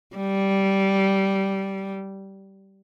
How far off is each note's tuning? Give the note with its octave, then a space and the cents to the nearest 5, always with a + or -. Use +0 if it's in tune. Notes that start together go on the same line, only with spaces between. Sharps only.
G3 -10